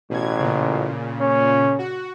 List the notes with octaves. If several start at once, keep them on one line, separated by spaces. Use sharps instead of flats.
A1 B2 G#6
A#2 C#3
C#4
F#4